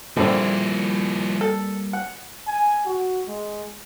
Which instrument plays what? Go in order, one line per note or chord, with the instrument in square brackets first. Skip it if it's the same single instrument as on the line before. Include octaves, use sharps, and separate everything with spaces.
[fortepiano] A#1 D3 C4 [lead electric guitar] F3 E4 [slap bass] G3 A#3
[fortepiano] A4
F#5
[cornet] G#5
F#4
G#3